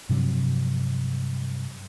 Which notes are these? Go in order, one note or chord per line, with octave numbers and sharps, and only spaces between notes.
G2 C3 F3 F#3